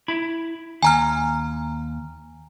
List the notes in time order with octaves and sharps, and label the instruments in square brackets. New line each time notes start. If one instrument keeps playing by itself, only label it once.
[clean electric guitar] E4 B5
[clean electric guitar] D#2 [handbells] G#5 A#5 F6